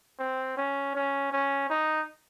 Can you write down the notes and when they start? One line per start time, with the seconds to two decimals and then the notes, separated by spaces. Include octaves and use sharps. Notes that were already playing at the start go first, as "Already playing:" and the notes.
0.19 C4
0.57 C#4
0.95 C#4
1.32 C#4
1.69 D#4